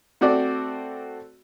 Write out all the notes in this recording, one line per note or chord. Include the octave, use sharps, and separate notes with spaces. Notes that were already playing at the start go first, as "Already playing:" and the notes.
A3 C4 F#4 D5